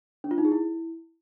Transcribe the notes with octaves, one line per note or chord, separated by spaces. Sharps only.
D4
F4
D#4
G#4
E4